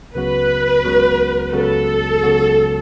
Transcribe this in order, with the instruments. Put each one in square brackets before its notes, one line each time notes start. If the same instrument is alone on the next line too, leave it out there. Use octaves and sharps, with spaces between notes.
[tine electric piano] C#2 C#3 F#3 B3 F#4 [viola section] B4
[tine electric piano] C#2 C#3 F#3 B3 F#4
[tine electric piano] C#2 C#3 F#3 B3 F#4 [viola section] A4
[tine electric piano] C#2 C#3 F#3 B3 F#4